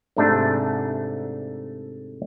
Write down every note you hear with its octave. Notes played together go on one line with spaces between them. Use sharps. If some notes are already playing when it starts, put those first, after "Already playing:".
G#2 C3 A3 D4